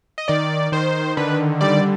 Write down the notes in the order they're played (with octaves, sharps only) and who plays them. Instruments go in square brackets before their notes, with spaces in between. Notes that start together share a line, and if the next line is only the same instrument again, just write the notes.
[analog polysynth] D#5
D#3 D5
D#3 C5
D3 B4
G3 D5